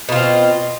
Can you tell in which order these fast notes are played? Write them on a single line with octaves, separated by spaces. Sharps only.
B2 F4 C4